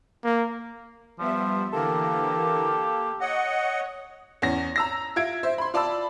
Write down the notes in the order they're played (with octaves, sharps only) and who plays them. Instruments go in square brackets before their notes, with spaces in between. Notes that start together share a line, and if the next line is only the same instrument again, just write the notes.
[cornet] A#3
[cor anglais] F3 [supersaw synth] G3 B3 E5
[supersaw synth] D3 E3 A#4 [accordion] A#3 [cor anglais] G4 [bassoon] A4
[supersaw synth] C#5 [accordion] D#5 F#5
[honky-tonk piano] E2 C#4 A#6
A#5 E6 A#6
F4 E5 G#6 D7
C5 E5
B5 C6
F4 D5 A5 B5 E6